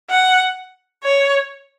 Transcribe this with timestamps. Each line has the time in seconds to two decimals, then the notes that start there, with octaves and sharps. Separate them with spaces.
0.10 F#5
1.04 C#5